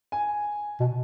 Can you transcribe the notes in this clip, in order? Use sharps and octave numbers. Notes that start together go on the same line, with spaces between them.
G#5
B2